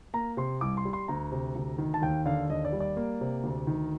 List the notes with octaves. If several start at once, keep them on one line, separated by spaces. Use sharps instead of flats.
A#3 A#5
C3 C6
C2 D6
C6
G3
C6
D2 A#5
C3
D2
D#3
A5
D#2 G5
D3 F5
D#2 D#5
D5
G3
D5
A#3
C3
D2
D#3